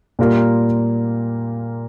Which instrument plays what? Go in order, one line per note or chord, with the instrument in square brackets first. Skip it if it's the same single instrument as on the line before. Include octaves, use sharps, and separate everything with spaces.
[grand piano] A#2 G3 A#3 F4 A#4